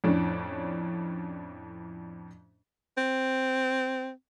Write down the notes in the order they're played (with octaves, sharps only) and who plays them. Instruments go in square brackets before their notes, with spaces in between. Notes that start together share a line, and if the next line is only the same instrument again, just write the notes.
[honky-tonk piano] F2 A2 C#4 D4
[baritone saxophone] C4